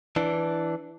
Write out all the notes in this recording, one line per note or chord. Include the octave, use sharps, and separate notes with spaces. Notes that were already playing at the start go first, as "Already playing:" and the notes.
E3 D4